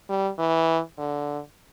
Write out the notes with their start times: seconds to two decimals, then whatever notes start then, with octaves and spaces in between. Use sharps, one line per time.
0.10 G3
0.39 E3
0.99 D3